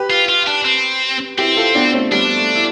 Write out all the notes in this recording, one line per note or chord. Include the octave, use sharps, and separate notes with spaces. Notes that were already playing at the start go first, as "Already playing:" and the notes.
Already playing: G4 B4
F4
F4
D4
C4
C4 E4 G4
F4 A4
B3 D4
A3 C4
G3 B3 D4
A3
E4